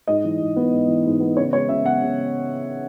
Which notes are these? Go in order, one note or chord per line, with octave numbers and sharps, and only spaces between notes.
G#2 D#5
E3
G#2
B3
G#2
E3
G#2
B3
C#3 C#5
G#3 C#5
C#3 E5
B3 F#5
C#3